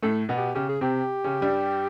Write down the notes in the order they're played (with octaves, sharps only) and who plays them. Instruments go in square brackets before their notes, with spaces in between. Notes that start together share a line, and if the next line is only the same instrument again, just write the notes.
[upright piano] A2 A3 [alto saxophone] A4
[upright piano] B2 B3
[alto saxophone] G4
[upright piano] C#3 C#4 [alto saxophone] G4
[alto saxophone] G#4
[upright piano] C3 C4 [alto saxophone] G4
[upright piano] C#3 C#4
G2 G3